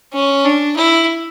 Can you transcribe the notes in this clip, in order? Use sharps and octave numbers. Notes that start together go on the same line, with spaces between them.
C#4
D4
E4